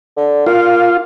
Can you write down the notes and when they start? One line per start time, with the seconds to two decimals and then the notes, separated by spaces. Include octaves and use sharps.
0.17 D3
0.46 A#3 F4